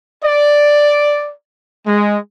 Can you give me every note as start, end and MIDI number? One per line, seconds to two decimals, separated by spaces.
0.22 1.30 74
1.85 2.17 56